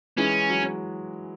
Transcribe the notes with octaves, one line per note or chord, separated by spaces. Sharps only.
E3 G#3 C#4
F#3